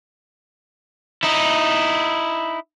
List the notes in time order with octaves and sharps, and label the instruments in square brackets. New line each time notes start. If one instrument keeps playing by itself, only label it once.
[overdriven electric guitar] D#4 E4